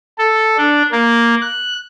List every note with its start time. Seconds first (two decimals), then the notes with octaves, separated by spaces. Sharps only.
0.18 A4
0.58 D4
0.92 A#3
1.41 F#6